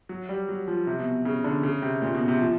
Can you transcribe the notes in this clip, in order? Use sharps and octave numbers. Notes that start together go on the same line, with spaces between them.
F#3
G3
F#3
F3
C3
B2
C#3
D3
C#3
C3
A#2
B2
C3
F3